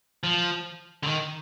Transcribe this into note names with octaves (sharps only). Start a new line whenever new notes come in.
F3
D3
D#3